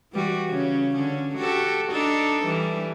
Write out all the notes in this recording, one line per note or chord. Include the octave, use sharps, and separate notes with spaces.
E3 G3 F#4
C#3 C#4
D3 C#4
F#4 G4 A4
D4 D#4 A4
E3 G3